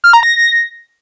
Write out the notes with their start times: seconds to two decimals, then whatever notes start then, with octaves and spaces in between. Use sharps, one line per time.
0.04 F6
0.13 A#5
0.23 A#6